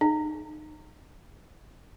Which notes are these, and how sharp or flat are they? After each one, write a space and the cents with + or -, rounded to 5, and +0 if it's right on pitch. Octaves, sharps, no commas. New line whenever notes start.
D#4 -25